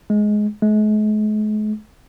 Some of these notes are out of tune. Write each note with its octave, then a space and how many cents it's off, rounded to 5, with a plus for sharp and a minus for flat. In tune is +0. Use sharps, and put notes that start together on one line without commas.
G#3 +15
G#3 +45